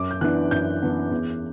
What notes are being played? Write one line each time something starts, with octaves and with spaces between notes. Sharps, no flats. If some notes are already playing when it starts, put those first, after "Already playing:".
Already playing: F#2 D6
G6
E3 B3 D4 F#6
F#2 G6
E3 B3 D4
E2